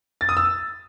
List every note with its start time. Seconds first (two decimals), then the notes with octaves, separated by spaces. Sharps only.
0.21 A6
0.29 D#6
0.37 E6